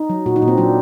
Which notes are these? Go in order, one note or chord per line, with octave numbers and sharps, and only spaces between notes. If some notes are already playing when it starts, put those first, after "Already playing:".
Already playing: D#4
F#3
A#2 F#4
D#4
A#2
C4
F#3 D4